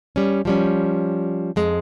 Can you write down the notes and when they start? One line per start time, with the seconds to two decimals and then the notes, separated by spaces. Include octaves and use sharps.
0.16 G3 C#4
0.45 F3 G3 C#4
1.56 F2 G#3